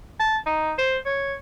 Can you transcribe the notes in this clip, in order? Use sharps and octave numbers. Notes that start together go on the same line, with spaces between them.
A5
D#4
C5
C#5